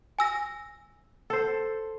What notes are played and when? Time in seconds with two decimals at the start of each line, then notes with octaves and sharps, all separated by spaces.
0.19 G#5 E6 A#6
1.30 A4 C5